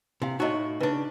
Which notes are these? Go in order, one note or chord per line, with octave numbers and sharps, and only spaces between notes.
C3 E4 F5
A2 D#4 E4 F#4 D#5
C#3 D4 B4